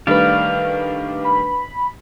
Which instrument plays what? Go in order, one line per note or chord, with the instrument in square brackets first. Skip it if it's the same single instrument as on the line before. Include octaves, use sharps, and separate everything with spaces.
[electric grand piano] D#3 G3 A3 [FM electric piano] D4 B4 [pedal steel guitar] D5 F5
[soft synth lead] B5